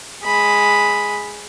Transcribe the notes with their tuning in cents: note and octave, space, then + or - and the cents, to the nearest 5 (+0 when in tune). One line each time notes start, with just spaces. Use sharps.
G#3 +0 B5 +0